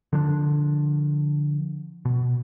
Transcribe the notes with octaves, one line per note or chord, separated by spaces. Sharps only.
D3 F3 D4
B2